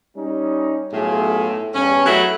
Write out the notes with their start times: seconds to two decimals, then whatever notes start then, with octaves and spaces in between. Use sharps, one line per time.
0.16 G3 C#4 D#4
0.93 B1 A2 F4 G#4
1.74 E2 G2 C#4
2.06 F#3 A3 E4